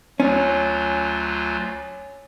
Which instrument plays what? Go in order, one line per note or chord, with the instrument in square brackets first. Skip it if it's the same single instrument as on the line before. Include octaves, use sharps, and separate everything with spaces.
[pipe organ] D2 F#3 F4 [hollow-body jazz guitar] C#4